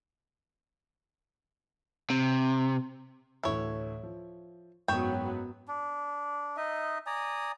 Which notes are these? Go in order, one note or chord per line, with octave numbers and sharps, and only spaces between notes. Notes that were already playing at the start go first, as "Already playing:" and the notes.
C3
D2 A2 E3 E4 C#5
F3
F#1 G#2 F#3 B3 C#5 G5 E7
D4
D#4 D#5 E5
D5 G#5 A#5 D#6